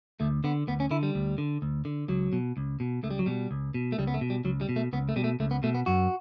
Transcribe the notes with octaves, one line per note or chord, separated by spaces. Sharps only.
D2 A3
D3 B3
D2 B3
C#4
D3 E4
G3
D2
D3
D2
D3
C#2 F#3
B2
C#2
B2
C#2 A3
G3
F#3
B2 G3
C#2
B2
A3
C#2 G3
B3
A3
B2
G3
C#2 F#3
G3
B2
A3
C#2 B3
A3
B2 G3
A3
C#2 A3
B3
B2 A3
B3
F#2 F#4